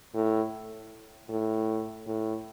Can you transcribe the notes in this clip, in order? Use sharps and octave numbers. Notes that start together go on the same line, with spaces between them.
A2
A2
A2